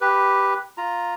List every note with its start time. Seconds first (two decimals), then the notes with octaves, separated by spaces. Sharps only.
0.01 G4 B4
0.78 F4 A#5